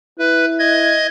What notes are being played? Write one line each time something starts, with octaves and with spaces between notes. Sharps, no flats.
E4 B4
D#5 G#6